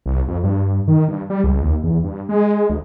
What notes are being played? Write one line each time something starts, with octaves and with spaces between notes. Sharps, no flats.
C2
F2
G2
D#3
G2
G3
C#2
D#2
E2
G2
G#3
D2